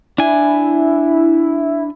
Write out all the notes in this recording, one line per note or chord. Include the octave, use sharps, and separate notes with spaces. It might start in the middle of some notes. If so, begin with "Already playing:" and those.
D4 E4 G#5